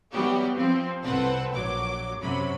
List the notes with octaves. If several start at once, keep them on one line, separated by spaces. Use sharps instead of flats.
E3 F#3 G3 B3 F#4 G4
F3 C4
C2 C4 A4 B4 F#5
A#1 F#3 D6
F#2 C3 F#3 B5